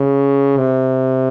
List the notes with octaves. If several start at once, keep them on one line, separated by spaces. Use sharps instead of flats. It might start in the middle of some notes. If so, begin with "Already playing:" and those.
Already playing: C#3
C3